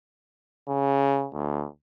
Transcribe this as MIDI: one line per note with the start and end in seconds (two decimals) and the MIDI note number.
0.68 1.27 49
1.34 1.66 38